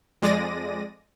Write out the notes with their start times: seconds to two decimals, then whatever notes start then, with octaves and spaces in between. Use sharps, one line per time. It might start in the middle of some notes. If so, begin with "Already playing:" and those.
0.22 F2 G#3 D5 A#6 D#7